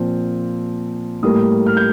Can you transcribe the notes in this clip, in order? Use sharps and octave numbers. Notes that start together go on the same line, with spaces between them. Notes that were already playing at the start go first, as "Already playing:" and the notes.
Already playing: A#2 F3 C4
A2 G3 A#3 D#6
F6
G6